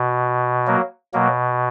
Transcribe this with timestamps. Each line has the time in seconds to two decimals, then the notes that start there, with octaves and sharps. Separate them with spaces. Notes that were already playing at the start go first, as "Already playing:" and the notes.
Already playing: B2
0.67 F#3 A#3
1.14 B2 F#3 A#3